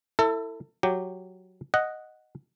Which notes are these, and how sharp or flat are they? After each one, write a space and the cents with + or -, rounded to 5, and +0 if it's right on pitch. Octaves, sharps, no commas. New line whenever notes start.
E4 +0 A4 +30
F#3 +0 G4 -5
D#5 +0 F#5 +0